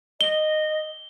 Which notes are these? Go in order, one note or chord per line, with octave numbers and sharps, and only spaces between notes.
D#5 G7